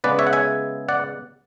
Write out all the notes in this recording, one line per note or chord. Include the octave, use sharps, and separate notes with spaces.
C#3 G#3 B3 B4 D5
C#5 E5
F#5
E5 G#5
D5 F#5